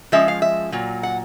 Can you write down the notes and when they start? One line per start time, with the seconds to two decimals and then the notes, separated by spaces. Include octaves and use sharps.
0.12 F3 G#3 C#4 E5
0.28 F5
0.42 E5
0.72 A#2 F#3
1.03 F#5